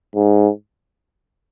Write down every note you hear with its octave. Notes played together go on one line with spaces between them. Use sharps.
G#2